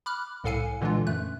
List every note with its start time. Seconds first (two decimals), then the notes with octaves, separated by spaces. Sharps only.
0.06 B5 D6 F6 F#6
0.44 C2 A2 A4 F5 G#5 C#7
0.81 A#2 D3 E3 G#3 D4 F4
1.07 F#2 A3 F#6